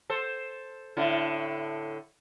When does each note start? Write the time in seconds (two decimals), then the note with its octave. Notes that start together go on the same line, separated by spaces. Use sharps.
0.10 A4 C5
0.97 A2 D3 E4